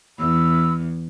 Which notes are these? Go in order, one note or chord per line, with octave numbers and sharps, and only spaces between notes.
E2 B5 E6